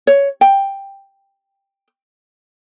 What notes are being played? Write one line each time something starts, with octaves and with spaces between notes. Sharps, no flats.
C#5
G5